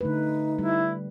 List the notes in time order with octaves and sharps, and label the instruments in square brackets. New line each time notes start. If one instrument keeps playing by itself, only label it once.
[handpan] D3 A3 B4 [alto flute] D#4
[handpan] G3 [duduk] E4